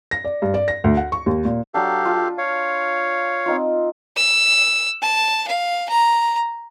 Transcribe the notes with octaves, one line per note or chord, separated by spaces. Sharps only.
A#6
D5
G2
D5
A#6
D2
F#5
C#6
D#2
A#2
F#3 D4 G4 A4 F5
F4
C#5 F5
C4 D#4 F4
E6
A5
F5
A#5